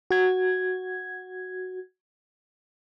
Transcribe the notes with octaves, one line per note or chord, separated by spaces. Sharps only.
F#4 G#6